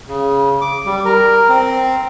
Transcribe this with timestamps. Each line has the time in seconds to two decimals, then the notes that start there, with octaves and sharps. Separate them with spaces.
0.08 C#3
0.61 D6
0.86 G3
1.05 A#4
1.49 C4